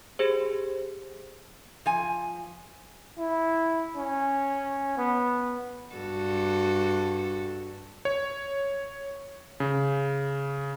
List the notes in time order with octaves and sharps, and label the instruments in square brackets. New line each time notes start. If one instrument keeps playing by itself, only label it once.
[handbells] G4 G#4 C5
[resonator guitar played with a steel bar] F3 G#5
[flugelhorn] E4
C#4
B3
[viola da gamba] G2 F#4 A4
[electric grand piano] C#5
C#3